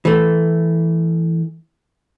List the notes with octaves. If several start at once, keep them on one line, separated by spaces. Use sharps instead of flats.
E3 A3